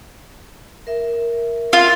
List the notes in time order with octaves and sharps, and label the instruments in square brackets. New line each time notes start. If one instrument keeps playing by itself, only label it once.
[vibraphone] A#4 E5
[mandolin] F4